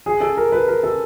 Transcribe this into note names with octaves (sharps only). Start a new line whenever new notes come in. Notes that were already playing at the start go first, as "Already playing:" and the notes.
G#4
A4
A#4
B4
A#4
A4